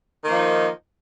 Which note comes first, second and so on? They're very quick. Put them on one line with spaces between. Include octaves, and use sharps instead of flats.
D#3 A#3 F3 D#4